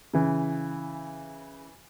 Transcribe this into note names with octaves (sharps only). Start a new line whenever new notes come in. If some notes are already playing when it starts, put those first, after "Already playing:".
C#3 E3